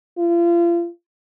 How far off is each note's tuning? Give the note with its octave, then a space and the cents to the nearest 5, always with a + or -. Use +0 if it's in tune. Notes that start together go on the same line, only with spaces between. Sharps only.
F4 -35